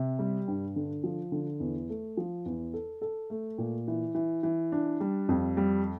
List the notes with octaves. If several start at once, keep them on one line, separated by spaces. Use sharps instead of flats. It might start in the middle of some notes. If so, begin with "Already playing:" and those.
Already playing: C3
G3
G2
D3
F3
D3
E2
A3
F3
E2
A4
A4
A3
A#2
E3
E3
E3
D4
G3
F2
G3